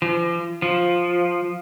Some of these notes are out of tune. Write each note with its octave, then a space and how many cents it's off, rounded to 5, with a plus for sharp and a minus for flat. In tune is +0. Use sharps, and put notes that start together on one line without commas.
F3 -40
F3 +5